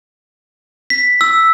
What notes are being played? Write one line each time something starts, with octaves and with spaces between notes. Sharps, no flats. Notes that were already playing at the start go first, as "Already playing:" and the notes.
B6
E6